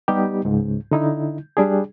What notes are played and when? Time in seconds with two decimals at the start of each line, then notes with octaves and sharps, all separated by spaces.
0.08 G3 B3 D#4 G4
0.45 C#2 G#2
0.91 D3 D#4 E4
1.57 G3 D4 G#4